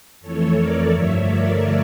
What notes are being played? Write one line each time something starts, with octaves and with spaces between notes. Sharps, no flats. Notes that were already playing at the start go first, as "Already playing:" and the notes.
F2 E3 A3 A4 C#5
A#4 D5
G2 D3 F3 A3 C#5 E5
A#4 D5